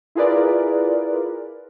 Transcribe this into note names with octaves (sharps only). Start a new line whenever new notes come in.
E4 F4 G#4 A#4 B4 D5